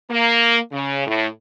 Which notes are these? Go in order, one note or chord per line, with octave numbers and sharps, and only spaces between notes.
A#3
C#3
A2